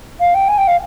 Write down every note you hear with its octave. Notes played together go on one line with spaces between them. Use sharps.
F5
G5
G#5
G5
F5